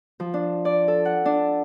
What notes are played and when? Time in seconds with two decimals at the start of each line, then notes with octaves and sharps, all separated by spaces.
0.20 F3
0.34 D4
0.65 D5
0.88 A4
1.05 F#5
1.25 D4